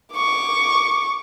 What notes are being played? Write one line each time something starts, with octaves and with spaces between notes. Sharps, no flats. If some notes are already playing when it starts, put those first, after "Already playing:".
C#6 D6